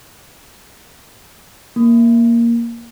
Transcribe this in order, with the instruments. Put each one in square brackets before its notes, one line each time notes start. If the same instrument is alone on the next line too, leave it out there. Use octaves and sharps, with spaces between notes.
[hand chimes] A#3